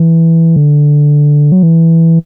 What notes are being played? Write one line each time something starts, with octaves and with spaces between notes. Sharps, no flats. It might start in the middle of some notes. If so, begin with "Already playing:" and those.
Already playing: E3
D3
F#3
E3